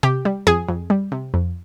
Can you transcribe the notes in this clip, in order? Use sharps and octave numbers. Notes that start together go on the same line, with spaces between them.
C3 G4
G3
F2 G#4
F2
G3
C3
F2